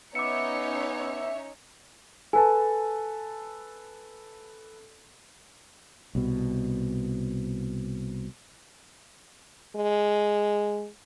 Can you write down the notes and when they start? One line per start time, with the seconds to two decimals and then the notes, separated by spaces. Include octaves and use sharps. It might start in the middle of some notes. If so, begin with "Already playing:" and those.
0.15 B3 C#4 D#4 C#5 E5 D6 C#7
2.33 A4 B4 G#5 A5
6.15 C2 B2
9.76 G#3